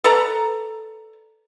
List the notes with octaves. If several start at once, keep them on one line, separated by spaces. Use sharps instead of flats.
A4 B4 D5 A#5